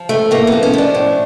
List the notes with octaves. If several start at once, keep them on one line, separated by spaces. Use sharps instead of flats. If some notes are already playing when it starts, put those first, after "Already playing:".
Already playing: F3
A2 A3
A2 A#3
F3 B3
C#4
F3 D4
A2